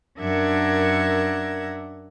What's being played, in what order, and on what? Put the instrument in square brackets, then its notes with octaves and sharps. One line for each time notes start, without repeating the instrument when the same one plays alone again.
[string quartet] F#2 D4 A#4 E5 F#5 G#6